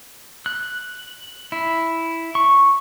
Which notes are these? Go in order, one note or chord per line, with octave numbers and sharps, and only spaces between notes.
F#6
E4
C#6